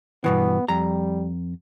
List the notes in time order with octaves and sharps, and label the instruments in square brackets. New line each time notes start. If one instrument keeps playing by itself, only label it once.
[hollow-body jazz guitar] G2 B2 E3 [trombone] B3
[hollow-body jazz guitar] F2 A#5 [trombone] G3